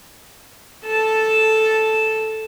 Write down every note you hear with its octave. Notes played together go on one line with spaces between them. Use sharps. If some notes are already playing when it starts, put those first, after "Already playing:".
A4 A5